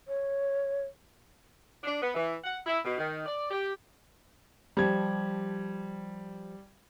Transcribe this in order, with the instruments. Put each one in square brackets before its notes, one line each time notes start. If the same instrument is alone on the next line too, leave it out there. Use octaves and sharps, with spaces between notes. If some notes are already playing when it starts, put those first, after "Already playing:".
[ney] C#5
[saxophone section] D4
B3
E3
F#5
E4
B2
D#3
D5
G4
[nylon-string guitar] F3 G4 A5 [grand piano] G3 G#6